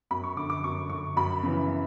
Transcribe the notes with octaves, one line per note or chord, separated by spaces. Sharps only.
F#2 B5
C#6
D3 D6
D6
F#2 C#6
D3 C#6
F#2 B5
C#3 E3